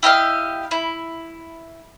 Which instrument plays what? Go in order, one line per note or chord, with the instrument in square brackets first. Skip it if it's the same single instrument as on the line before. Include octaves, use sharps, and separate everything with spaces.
[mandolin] E4 G4 D#5 F5
E4